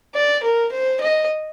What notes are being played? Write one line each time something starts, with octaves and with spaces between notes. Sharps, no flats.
D5
A#4
C5
D#5